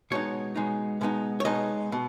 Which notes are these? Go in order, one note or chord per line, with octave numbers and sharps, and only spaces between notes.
B2 G#3 B3 D#4 C#5
B2 G#3 B3 D#4
B2 G#3 B3 D#4
C#5
B2 G#3 B3 D#4 D#5
B2